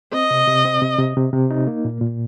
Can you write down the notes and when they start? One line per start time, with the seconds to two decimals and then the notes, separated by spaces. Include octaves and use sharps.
0.13 C4 D#5
0.31 C3
0.47 C3
0.65 C4
0.82 C3
0.98 C3
1.17 C3
1.33 C3
1.51 D#4
1.67 A#3
1.85 A#2
2.01 A#2